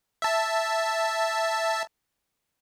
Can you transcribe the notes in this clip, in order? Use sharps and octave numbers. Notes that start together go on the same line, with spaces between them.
E5 A5